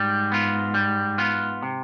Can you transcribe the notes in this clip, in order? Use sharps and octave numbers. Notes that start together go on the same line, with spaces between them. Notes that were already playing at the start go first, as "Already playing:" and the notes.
Already playing: G#2 G3
B3 F4
G3
B3 F4
C3